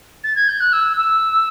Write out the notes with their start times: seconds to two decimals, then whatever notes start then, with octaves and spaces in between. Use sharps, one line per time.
0.24 A6
0.35 G#6
0.48 G6
0.60 F#6
0.72 E6
0.96 E6